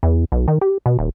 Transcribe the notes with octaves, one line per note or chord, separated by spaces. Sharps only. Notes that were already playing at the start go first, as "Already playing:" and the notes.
E2
B1
D#3
G4
B2
D#1